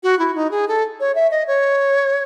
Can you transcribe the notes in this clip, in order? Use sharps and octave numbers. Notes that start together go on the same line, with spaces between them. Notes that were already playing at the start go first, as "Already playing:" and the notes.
F#4
E4
D#4
G#4
A4
C#5
E5
D#5
C#5